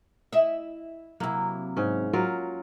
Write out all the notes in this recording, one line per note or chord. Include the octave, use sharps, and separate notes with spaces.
E4 D#5 E5
C3 F#3 A#3 E4
G#2 C#4
F#3 F4 A#4